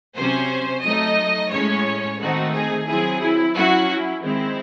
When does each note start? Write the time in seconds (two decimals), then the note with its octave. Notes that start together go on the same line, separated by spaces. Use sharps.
0.15 C3 F#3 C#4 C5
0.82 F#3 A3 D#4 D#5
1.50 A2 G#3 C#4 C#5
2.19 D#3 A3 C4 D#4 F#4
2.53 G#4
2.87 F#3 C4 E4 G#4
3.21 E4
3.55 F#3 C#4 E4 F#4
3.89 E4
4.22 D#3 G#3 C4 E4